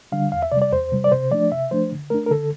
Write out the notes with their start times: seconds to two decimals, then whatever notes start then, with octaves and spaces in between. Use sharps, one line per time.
0.12 D3 G3 D4 F5
0.32 E2 F5
0.42 E5
0.52 C3 G3 D5
0.62 D5
0.72 E2 C5
0.92 C3 G3
1.04 D5
1.12 C3 C5
1.31 F3 A3 D4 D5
1.52 C3 E5
1.71 F3 A3 D4 C5
1.91 D3
2.10 A3 D4 A#4
2.26 A#4
2.31 D3 A4